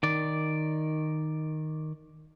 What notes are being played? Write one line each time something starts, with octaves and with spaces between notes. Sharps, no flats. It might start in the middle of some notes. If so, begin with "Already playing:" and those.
D#3 D5